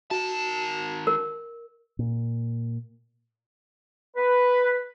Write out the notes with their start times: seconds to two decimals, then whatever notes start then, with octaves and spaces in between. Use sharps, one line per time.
0.11 D#3 F#4 A5
1.07 A#4
1.99 A#2
4.17 B4